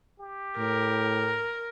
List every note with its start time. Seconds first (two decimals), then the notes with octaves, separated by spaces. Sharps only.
0.20 G4
0.58 A2 A#4